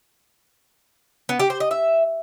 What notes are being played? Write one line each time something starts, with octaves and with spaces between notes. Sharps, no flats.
B3
G4
C5
D#5
E5